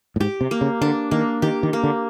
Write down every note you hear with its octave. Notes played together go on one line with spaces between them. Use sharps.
A2
G#2 G4
C3
A#3
C#3
D3 D4
D#3 A#3
D#3 G4
D#3
A#3
D3